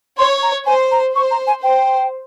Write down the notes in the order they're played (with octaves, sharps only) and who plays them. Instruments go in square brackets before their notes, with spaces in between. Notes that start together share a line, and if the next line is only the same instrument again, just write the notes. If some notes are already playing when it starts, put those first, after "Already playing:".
[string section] C#5 [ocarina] C6
[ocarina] A#5
[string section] C5 [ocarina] G#5
[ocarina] A#5
[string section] C5 [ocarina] C#6
[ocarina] A#5
G#5
[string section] C5 [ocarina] G5